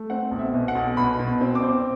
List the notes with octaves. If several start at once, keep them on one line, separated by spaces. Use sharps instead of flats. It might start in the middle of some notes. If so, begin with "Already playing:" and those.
Already playing: A3
C4 F#5
B1
E5
B2
F#5
B1
B2 B5
B2
C4
D6
C4